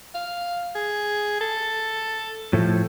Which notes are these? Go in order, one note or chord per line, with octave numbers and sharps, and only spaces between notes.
F5
G#4
A4
A2 F3 A3